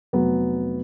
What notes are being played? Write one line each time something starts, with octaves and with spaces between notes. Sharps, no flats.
F1 F#3 B3